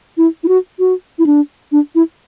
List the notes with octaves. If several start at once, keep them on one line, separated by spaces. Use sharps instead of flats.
E4
E4
F#4
F#4
E4
D4
D4
E4